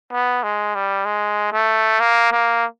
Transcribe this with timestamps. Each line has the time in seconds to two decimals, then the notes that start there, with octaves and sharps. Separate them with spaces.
0.12 B3
0.43 G#3
0.75 G3
1.06 G#3
1.53 A3
2.00 A#3
2.32 A#3